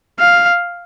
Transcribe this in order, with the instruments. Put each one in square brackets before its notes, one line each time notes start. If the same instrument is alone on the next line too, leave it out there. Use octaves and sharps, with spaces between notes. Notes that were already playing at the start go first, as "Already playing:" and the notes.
[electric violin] F5